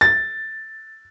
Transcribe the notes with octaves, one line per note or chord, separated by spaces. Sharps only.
A6